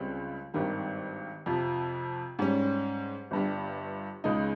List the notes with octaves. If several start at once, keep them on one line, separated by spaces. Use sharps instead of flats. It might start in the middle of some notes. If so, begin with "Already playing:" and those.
Already playing: C#2 C#3 G3 C4
G#1 G2 D#3 G3
F2 C3 F3
G#2 G3 C#4
G1 G2 G3
C#2 C#3 G#3 D#4